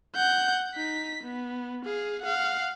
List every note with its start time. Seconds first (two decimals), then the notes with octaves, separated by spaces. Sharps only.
0.16 F#5 G6
0.75 D#4 B6
1.23 B3
1.85 G#4 F5
2.22 F5 F#5